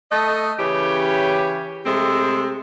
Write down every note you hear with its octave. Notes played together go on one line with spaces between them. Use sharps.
A3 A4 D#5
C#3 E3 C#4 G4
C3 G#3 A3 C4